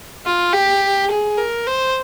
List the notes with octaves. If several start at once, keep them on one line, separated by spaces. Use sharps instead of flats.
F4
G4
G#4
A#4
C5